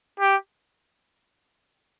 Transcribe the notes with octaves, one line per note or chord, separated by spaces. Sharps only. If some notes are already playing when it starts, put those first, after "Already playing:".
G4